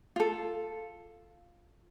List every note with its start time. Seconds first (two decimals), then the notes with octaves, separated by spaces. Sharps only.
0.16 F4 A4